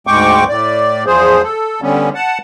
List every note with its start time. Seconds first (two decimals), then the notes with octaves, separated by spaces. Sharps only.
0.07 D2 G#2 G#3 G5 C#6 D6
0.49 A2 D5
1.06 E2 F3 G#4 C5
1.43 A4
1.82 D3 G3 B3 C#4
2.15 F#5 A5